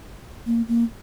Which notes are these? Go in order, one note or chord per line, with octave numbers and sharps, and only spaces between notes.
A#3
A#3